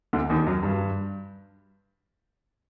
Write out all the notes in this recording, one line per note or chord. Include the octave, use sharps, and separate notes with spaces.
D2 D3
D#2 D#3
F#2 F#3
G2